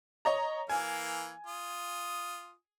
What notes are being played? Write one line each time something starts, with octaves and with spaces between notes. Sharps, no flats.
C#5 D#5 A#5
E3 A#3 F5 G#5
F4 D#6